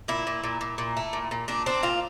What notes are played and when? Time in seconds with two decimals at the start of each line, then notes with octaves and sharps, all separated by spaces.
0.08 A#2 E4
0.27 A#2
0.44 A#2
0.61 A#2
0.78 A#2
0.97 A3
1.13 A#2
1.31 A#2
1.48 A#2 D4
1.66 C4 D4
1.83 A#2 F4